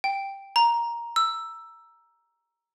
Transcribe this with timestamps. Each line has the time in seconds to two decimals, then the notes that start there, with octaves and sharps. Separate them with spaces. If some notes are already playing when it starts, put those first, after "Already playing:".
0.04 G5
0.56 A#5
1.16 E6